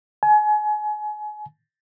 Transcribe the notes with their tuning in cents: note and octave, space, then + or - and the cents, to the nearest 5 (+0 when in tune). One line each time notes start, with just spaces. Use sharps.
G#5 +30